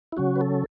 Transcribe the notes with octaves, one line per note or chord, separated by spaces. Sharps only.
E4
C#3 F#3 C#4 F#4
B4
A4